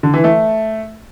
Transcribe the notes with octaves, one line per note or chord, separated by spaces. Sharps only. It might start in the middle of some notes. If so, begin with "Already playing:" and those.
D3
E3
A3